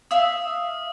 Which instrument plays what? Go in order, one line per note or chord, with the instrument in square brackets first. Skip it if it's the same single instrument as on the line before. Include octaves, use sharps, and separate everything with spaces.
[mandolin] E5 F5 E6 [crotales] D#6